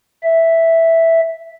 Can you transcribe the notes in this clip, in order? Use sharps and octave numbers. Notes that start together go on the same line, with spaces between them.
E5